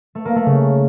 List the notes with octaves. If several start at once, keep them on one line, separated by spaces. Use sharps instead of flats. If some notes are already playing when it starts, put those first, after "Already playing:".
A3
A#3
A3
C#3